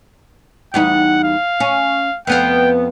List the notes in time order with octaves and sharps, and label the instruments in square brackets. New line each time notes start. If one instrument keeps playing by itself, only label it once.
[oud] E2 G3 D#4 [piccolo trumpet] F#5
[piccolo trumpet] F5
[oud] C#4
[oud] F2 B3 F5 [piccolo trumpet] G5